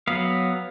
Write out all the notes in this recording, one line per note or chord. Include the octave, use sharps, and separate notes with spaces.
F#3 B3 F5